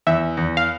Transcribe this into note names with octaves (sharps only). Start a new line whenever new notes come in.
E2 E5
E2
F5